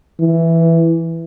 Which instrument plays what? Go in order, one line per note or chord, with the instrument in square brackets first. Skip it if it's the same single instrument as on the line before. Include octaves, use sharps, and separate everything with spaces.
[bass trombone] E3